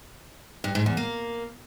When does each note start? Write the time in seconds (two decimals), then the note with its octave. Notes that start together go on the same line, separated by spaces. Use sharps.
0.64 G2
0.75 G#2
0.86 E2
0.97 A#3